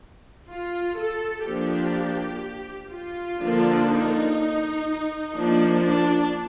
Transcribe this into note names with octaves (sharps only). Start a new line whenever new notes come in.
F4
A4
F3 A#3 D4 G4
F4
D3 F3 A#3 D4
D#4
F3 A#3 D4
D4